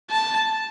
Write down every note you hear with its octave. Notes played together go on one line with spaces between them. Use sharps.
A5